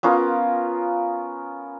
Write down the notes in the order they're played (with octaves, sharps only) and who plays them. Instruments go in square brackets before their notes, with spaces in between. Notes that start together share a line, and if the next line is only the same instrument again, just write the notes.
[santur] B3 C#4 F4 A#4